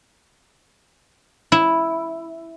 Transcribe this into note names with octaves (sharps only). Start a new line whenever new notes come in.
E4